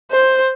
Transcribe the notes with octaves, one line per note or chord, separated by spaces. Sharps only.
C5